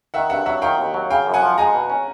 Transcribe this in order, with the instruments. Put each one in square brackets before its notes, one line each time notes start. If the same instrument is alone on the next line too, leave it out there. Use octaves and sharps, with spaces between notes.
[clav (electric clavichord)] D#3 [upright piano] E5 F#5
[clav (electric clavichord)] G2 [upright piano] E5 F#5
[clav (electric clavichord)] F#3 [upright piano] E5 F#5
[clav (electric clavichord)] D#3 [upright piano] F5 G5
[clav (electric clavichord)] D#2
F#3
[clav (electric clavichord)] C#3 [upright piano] F5 G5
[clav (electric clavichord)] F#2
[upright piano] F#5 G#5
[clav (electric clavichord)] F3
[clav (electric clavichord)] G#3 [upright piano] G#5 A#5
[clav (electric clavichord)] B2
C#4